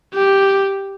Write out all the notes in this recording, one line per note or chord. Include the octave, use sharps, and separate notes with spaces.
G4